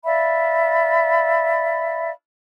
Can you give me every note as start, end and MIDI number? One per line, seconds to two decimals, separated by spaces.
0.04 2.10 74
0.04 2.10 76
0.04 2.10 77
0.04 2.10 83